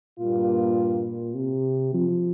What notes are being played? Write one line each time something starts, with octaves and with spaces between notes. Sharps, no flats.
G2 A#2 G3 A#3 F4
C3
F3